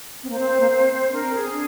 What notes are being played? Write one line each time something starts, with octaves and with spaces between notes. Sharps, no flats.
C4
A#3 C5
C4
C4
A#3
C4
C4
D4 A#4
C4
G#4
C4
D4